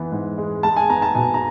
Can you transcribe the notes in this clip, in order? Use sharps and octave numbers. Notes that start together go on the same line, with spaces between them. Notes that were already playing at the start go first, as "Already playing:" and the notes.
Already playing: E3 B3
G#2
G#3
G#3 A5
G#5
B3 A#5
A5
B2 G#5
A#5